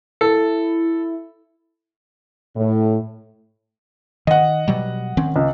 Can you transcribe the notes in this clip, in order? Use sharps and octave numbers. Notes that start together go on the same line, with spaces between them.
E4 A4
A2
D#3 D#5 F#5
B2 F#3 G3
D#3 C4 C#4
C#2